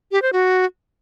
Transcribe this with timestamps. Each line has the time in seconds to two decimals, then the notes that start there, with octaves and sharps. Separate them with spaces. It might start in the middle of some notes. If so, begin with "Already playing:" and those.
0.12 G4
0.22 C5
0.33 F#4